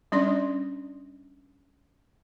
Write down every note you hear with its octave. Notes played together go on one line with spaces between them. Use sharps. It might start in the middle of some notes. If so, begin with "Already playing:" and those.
G3 C#4 D4 D5 C6